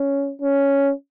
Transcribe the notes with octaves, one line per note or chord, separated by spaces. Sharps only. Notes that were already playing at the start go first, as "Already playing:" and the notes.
Already playing: C#4
C#4